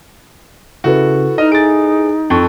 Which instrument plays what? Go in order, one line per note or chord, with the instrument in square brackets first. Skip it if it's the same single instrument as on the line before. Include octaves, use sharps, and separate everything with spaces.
[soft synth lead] C#3 [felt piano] E4 A4 B4 [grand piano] F#4
[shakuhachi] D#4 [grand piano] D#5 [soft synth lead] F6
[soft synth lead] G#4 [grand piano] A6 D7
[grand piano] F2 C#6 [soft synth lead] A4